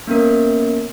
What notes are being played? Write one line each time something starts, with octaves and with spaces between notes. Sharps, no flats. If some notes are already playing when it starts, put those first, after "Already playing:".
A#3 B3 C#4 A#4